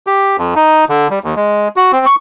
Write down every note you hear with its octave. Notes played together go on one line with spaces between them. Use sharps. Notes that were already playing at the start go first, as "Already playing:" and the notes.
G4
F2
D#4
D3
G3
D#2
G#3
F#4
C4
C#6